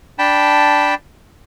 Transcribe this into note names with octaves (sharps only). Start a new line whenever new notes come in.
D4 G5 A5 B5